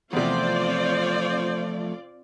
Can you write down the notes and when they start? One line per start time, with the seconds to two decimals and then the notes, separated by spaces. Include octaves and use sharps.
0.13 E2 C3 F3 A3 C4 F4 C5 D5